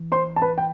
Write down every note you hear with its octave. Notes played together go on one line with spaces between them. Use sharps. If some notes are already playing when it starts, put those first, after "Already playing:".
Already playing: E3
C5 C6
A5
B4 B5
G5